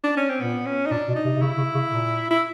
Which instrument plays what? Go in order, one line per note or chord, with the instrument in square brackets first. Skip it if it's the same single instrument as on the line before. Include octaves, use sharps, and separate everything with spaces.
[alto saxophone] D4
C#4
C4
[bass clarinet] A#2 [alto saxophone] B3
[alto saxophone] C#4
D#4
[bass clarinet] A#2 [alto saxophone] D4
[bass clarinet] B2
[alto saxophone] D#4
[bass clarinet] C3
C3
[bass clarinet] C#3 [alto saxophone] E4
[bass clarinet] C#3
C#3
A#2
[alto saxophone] E4